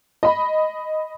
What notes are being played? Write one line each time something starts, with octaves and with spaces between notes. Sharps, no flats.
D#5 B5